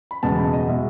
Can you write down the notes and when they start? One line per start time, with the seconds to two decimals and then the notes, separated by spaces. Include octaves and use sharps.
0.11 B5
0.23 F#1 E2 B2 G#3 A5
0.38 B5
0.53 D#5
0.68 B2 G#3 E5